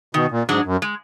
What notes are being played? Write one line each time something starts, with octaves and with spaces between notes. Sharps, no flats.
B2 D#3
A#2
G#2 F#3 D4 G#4
F#2
G#3